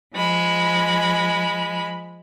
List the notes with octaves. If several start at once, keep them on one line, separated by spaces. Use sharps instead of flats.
F3 G#3 B5